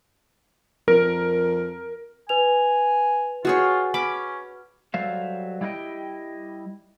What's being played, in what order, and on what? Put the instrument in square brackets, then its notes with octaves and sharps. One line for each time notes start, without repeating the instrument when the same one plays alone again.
[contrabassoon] F2 [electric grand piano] A#4
[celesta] B4 F7 [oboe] G#5
[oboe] F4 [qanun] F#4 G#4 C#5
[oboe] C#4 [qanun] B5 D6
[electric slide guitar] F#3 G3 A4 C5 E5 F5
G3 E4 F4 B4 D#5 G5